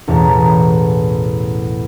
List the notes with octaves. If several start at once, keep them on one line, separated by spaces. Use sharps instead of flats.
A1 E2 B2 A5 A#5